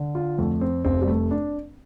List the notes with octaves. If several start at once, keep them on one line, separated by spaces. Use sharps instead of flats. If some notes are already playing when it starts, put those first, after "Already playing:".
Already playing: D3
F4
F2 A3
C4
F1 C4
G3
A3
D4